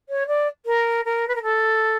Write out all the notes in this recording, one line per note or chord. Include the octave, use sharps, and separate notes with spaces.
C#5
D5
A#4
A#4
B4
A#4
A4